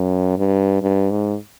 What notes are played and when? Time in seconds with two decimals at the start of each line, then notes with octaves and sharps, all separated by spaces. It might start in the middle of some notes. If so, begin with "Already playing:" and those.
Already playing: F#2
0.38 G2
0.82 G2
1.11 G#2